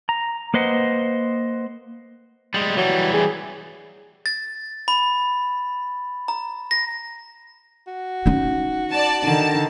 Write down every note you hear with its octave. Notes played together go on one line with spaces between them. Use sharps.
A#5
A#3 B4 C5 D#5 F#5
G3 G#3
E3 F#3 G3
G#4
A6
B5
A#5
A#6
F#4
C#4 D#4
D5 A5
D3 D#3 A5